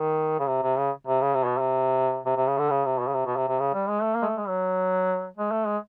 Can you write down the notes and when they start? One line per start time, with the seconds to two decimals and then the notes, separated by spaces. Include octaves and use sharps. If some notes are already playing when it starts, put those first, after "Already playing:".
Already playing: D#3
0.39 C#3
0.47 C3
0.62 C3
0.77 C#3
1.07 C3
1.21 C#3
1.34 C3
1.45 B2
1.58 C3
2.25 C3
2.36 C3
2.47 C#3
2.58 D3
2.70 C#3
2.85 C3
3.00 B2
3.08 C#3
3.14 C3
3.26 B2
3.36 C3
3.48 C3
3.59 C#3
3.74 G3
3.88 G#3
4.03 A3
4.15 A#3
4.22 G#3
4.26 A3
4.37 G#3
4.48 F#3
5.37 G#3
5.51 A3
5.67 G#3